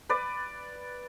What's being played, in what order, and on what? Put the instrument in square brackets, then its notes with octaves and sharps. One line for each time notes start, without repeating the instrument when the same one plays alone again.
[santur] B4 D5